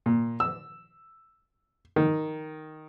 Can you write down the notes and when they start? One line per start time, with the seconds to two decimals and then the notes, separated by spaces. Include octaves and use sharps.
0.06 A#2
0.40 E6
1.96 D#3